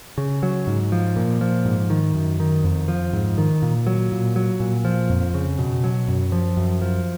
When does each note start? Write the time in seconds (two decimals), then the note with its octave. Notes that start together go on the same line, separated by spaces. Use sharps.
0.18 C#3
0.43 F#3
0.67 G#2
0.92 F3
1.16 A#2
1.41 F3
1.65 G#2
1.90 D#3
2.14 F#2
2.40 D#3
2.64 F2
2.88 F3
3.13 G#2
3.38 D#3
3.62 A#2
3.87 F#3
4.12 A#2
4.36 F#3
4.60 A#2
4.85 F3
5.10 F2
5.34 C#3
5.59 B2
5.84 F#3
6.08 F#2
6.32 F3
6.57 F#2
6.82 F3